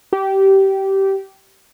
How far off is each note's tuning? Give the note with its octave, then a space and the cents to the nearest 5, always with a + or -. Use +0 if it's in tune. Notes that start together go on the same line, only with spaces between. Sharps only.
G4 -20